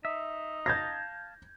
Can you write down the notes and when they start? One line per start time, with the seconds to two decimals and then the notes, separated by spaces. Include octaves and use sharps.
0.05 D#4 E5
0.66 F5 A5 G6 G#6 A#6